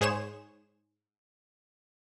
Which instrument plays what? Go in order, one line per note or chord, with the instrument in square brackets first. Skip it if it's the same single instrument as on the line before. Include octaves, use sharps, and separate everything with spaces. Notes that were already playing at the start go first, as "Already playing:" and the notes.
[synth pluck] G#2 G#4 C5 C#5 E7